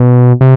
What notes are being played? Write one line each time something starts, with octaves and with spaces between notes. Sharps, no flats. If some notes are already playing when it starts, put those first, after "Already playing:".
Already playing: B2
C3